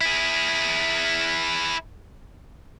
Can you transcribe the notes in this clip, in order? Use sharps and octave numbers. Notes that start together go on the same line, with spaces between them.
E4 G#4